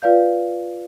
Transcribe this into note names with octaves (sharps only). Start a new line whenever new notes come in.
F4 B4 D5 F5 G6